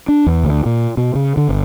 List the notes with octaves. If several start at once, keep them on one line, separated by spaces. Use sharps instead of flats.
D4
E2
D2
A#2
B2
C#3
D3
G1